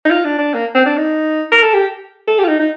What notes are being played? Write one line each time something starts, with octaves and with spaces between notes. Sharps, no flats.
D#4
F4
D4
D4
A#3
C4
D4
D#4
A#4
A4
G4
A4
G4
F4
D#4
D#4